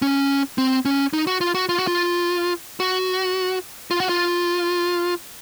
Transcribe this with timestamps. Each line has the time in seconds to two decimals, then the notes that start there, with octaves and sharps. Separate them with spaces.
0.02 C#4
0.58 C4
0.85 C#4
1.13 D#4
1.27 F#4
1.41 F4
1.55 F#4
1.69 F4
1.79 F#4
1.88 F4
2.80 F#4
3.91 F4
4.00 F#4
4.09 F4